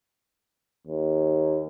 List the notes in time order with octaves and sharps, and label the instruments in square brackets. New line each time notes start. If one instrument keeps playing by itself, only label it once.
[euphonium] D#2